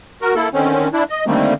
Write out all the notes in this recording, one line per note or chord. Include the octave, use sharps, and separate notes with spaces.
F#4 A#4
A#3 E4 A4
D3 D#3 C4 C#4
D4 E4
D#5
D3 D#3 G3 A3 A#3 C4